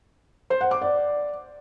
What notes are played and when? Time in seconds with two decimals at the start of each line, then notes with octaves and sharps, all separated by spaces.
0.50 C5
0.61 F#5
0.71 D6
0.81 D5